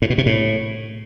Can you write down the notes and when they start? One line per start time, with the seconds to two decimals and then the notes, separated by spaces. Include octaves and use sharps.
0.02 A2
0.10 B2
0.18 C3
0.26 A2